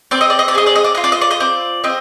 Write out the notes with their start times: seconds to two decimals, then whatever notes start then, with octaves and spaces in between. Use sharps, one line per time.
0.11 C4 D5
0.21 D#5
0.30 D5
0.39 D#5
0.48 D5
0.55 G#4 D#5
0.66 D5
0.76 D#5
0.84 D5
0.95 F4 D#5
1.04 D5
1.12 D#5
1.21 D5
1.31 D#5
1.40 C4 D5
1.84 C4 D#5